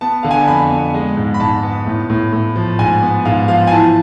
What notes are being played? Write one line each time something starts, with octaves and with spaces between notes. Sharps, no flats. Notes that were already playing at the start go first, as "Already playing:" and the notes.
B3 A5
D3 F5
G#5
A5
F2 B5
B3
G#3
G#2
B5
G#2 A5
B3
A2
A2
A2
F3
G#2 G#5
B3
G#2 F5
F3 F5
G#5
E3 A5